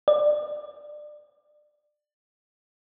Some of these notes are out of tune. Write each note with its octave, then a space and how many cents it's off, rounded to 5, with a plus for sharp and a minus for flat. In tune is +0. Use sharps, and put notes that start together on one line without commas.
D5 +25